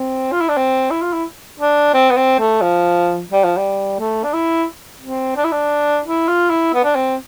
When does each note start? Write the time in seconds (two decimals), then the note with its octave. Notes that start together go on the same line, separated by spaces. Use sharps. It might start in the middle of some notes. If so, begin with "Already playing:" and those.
Already playing: C4
0.32 F4
0.41 E4
0.49 D4
0.57 C4
0.91 E4
1.02 F4
1.13 E4
1.60 D4
1.94 C4
2.11 B3
2.17 C4
2.39 A3
2.62 F3
3.31 G3
3.44 F3
3.57 G3
3.99 A3
4.24 D4
4.33 E4
5.01 C4
5.36 D4
5.44 E4
5.52 D4
6.05 E4
6.28 F4
6.50 E4
6.74 B3
6.84 D4
6.95 C4